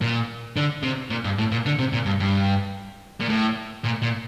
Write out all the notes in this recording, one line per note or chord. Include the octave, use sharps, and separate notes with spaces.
A#2
D3
C3
A#2
G2
A2
A#2
D3
C3
A#2
G2
G2
A#2
A2
A#2
A#2